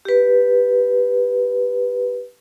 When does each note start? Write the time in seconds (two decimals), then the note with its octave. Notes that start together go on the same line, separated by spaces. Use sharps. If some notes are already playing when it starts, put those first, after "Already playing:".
0.05 G4 B4